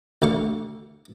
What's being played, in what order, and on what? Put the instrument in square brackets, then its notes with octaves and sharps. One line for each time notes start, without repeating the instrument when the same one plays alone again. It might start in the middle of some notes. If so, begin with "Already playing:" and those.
[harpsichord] D2 D3 F5 C#6